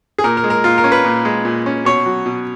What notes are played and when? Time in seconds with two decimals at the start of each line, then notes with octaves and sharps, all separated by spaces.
0.18 G#4
0.24 A#2 A#4
0.37 A#4
0.44 G#3
0.50 A#4
0.64 A#2 F4
0.78 A#4
0.84 C#4
0.92 B4
1.04 A#2
1.25 G#3
1.45 A#2
1.66 C#4
1.85 B2 C#5
2.06 F#3
2.26 B2